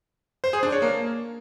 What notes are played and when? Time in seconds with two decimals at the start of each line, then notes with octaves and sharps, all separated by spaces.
0.44 C5
0.53 G#4
0.63 D4
0.72 C#5
0.82 A#3